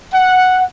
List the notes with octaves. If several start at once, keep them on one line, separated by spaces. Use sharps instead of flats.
F#5